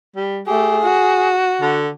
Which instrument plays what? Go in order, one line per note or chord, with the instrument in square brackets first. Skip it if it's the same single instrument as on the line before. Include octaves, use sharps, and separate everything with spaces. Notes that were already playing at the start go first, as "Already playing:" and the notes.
[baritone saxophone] G3
[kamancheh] A3 G4 [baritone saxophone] G#4
[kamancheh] F#4
[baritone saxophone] D3